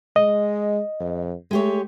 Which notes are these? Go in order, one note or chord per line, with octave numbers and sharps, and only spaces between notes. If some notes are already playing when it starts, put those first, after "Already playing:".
G#3 D#5
F2
G#3 A3 G4 C#5